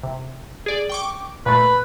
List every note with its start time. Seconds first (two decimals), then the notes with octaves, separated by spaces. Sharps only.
0.03 C3
0.66 G#4 D5
0.89 G5 C#6 D6
1.46 A#2 A3 B4